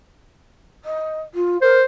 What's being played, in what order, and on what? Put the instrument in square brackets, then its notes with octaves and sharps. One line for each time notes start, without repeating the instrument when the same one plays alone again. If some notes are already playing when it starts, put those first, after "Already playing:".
[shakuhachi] D#5
F4
[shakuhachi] A#4 [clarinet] C5